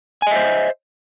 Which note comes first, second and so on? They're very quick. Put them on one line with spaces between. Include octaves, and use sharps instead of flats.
G#5 D#5 E5 C5